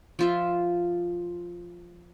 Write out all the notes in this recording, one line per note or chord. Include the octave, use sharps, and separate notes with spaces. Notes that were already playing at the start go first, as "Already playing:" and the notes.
F3 F4 E5